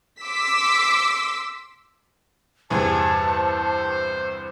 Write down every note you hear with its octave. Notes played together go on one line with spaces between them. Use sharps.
C6 D6 E6 B6
E2 G2 C3 G#4 A5
C5